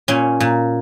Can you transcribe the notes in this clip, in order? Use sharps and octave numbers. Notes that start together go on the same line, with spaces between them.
A#2 C#4
A#2